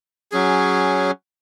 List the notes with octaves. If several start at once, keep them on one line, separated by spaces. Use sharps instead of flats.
F#3 C#4 G#4